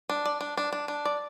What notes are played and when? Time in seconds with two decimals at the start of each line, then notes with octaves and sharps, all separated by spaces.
0.09 D4
0.26 D5
0.41 D4
0.57 D4
0.73 D4
0.88 D4
1.05 D5